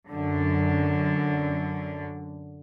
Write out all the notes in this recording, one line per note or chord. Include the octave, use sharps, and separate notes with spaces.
F#2 D3